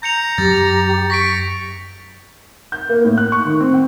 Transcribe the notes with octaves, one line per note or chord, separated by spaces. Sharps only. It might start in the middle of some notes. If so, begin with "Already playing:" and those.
A#5 G6 C#7 F7
F#2 G4 A6
C#6 A#6 B6 D7
G6
A#3
A2
F#6
C#6
D#3
C4
G5